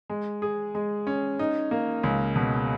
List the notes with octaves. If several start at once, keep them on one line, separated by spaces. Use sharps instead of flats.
G#3
G#4
G#3
C#4
D#4
A#3
C#2
B2